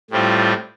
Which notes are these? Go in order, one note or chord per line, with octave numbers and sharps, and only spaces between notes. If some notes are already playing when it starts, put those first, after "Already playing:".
A2 G3 C4 F4